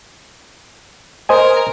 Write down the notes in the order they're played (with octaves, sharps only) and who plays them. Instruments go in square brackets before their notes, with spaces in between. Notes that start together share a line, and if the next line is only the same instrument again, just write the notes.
[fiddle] A#4 [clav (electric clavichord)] C5 D#5 G#5